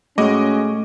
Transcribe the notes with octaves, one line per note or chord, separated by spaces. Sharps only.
A2 G#3 C#4 F#4 D#5 D6